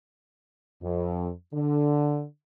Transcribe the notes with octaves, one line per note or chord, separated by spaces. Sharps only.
F2
D3